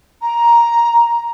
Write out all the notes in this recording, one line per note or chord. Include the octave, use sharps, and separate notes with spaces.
A#5